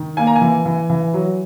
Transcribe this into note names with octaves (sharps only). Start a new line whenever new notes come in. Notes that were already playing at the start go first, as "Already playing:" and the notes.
Already playing: D#3
A#3 G#5
A#5
G#5
E3
E3
E3
F#3